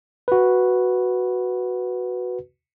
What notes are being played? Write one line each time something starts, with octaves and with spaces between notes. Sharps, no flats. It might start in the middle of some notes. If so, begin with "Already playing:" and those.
F#4 B4